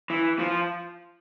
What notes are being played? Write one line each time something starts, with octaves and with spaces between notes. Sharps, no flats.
E3
F3